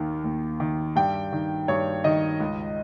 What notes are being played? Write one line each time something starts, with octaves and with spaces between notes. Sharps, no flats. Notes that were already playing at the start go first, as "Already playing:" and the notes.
Already playing: D#2 D#3
D#2
D#3
G2 G5
D#3
G2 C#5
D#3 D#5
C#2